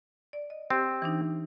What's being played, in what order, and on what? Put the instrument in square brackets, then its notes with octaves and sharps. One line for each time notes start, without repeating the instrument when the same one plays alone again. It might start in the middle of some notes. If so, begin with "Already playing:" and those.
[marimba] D5
D#5
[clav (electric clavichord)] C4 [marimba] G4
[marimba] E3 D4 D#4